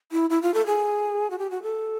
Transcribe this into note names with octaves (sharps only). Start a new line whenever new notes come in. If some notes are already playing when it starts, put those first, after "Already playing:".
E4
E4
F4
A4
G#4
F#4
G4
F#4
A4